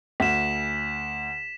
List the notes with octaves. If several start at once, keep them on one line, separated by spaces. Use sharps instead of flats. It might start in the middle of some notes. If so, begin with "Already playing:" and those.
D2 B6 E7